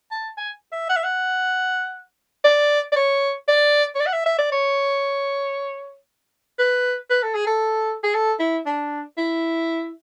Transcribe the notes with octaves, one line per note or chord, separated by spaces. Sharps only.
A5
G#5
E5
F#5
E5
F#5
D5
D5
C#5
D5
C#5
D5
F#5
E5
E5
D5
C#5
B4
B4
A4
G#4
A4
G#4
A4
E4
D4
E4